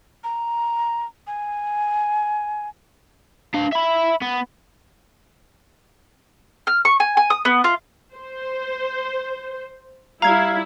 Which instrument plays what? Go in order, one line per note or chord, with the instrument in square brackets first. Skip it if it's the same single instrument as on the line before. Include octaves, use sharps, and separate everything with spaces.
[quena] A#5
G#5
[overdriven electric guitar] D4 F5
E5 B5
B3
[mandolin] F6
C#6
G#5
G#5
D#6
B3
F4
[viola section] C5
[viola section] G3 E4 [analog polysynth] F5 G#6 [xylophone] A#5